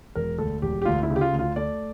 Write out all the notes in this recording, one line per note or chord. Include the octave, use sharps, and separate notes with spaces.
E1 A#4
D2 A4
E1 G4
G4
D2 F4
E4
C#3
G4
F4
D2
F4
A3 D5